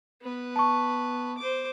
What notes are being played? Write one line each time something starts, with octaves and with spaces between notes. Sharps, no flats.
B3 B4
A5 C#6
C5 D6